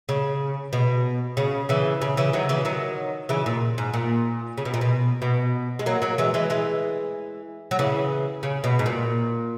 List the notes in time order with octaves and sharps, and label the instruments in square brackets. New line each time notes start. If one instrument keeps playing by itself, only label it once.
[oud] C#3
B2
C#3
C#3 E3
C#3
C#3 E3
D#3 F#3
C#3 E3
D#3 F#3
C#3 E3
A#2
G#2
A#2
C#3
B2
A#2
B2
B2
G#3
F#3 A#3
F#3 A#3
E3 G#3
E3 G#3
E3 G#3
F#3
C#3 E3
C#3
B2
G#2
A#2